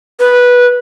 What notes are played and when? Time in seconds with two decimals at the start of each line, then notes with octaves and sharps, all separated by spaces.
0.20 B4